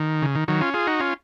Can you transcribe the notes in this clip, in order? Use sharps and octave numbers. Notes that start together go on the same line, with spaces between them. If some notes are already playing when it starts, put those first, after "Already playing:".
Already playing: D#3
C#3
D#3
D#3 F#3
C#4 F4
F4 G#4
D#4 F#4
C#4 F4